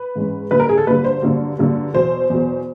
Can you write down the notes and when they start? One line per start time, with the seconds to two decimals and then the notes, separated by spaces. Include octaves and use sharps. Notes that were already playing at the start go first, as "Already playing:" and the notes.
Already playing: B4
0.15 G#2 E3 G#3 C#4
0.51 G2 D3 F#3 A#3 B4
0.60 A#4
0.69 G#4
0.78 A4
0.87 G2 D3 F#3 A#3 B4
1.04 C5
1.22 G2 D3 F#3 A#3
1.58 G2 D3 F#3 A#3
1.94 E2 B2 F#3 C5
2.30 E2 B2 F#3